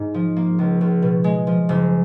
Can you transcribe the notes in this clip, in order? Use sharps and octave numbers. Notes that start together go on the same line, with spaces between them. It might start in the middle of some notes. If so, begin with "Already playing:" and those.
Already playing: G#2 D#4
F3
A#3
C#2
C#2
B2
G#3
F3
F#1